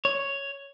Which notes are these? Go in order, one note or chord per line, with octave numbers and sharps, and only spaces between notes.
C#5